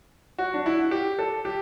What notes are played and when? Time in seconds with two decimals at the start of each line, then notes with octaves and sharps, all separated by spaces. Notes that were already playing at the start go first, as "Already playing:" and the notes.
0.38 F#4
0.54 D4
0.66 E4
0.79 F#4
0.91 G4
1.19 A4
1.45 G4